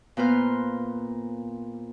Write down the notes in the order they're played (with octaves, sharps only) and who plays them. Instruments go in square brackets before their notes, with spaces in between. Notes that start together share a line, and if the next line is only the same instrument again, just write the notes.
[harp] A#2 B3 B4 C5 F6